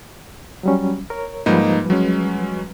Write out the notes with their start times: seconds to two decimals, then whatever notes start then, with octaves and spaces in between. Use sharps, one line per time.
0.63 F#3 G3 C#4
1.10 A#4 C#5
1.46 G#2 F3 G3 A#3 D#4 B4
1.90 F#3 G#3 C#4